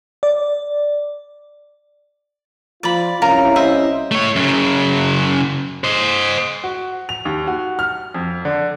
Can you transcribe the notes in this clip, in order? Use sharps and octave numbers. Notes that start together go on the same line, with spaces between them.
D5
F3 F4 D5 B5
C2 C#4 E4 A#4 F5 A#5
C5 D#5 E5
A3 C#5
F#2 C#3
C5 D#5
F#4
F7
D#2
F#4
F6
F2
D3